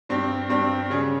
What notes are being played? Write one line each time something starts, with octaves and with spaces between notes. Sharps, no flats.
G2 G3 C4 G4
G2 G3 C4 G4
C#3 G3 C#4 G#4